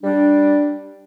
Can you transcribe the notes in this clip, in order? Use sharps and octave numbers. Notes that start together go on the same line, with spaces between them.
G3 D4